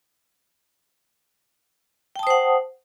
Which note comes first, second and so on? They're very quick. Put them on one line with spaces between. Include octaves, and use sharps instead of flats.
G5 A5 D#6 C5 F#5